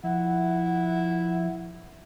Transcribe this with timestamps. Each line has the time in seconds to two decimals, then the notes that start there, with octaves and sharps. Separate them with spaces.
0.04 F3 E4 F#5